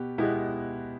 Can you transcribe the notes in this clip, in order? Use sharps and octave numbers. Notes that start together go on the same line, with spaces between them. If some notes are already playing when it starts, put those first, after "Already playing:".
Already playing: B2 B3 G4
B2 G#3 B3 E4 G4